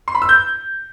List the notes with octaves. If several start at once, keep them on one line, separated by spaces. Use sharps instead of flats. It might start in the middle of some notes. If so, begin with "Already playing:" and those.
C6
B5
E6
G6